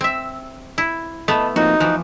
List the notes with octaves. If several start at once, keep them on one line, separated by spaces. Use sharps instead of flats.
C4 E5
E4
A3 B3 D#5 E5 A5 B5
F3 A#3 C4 D#4 F#4
E3 F3 F#6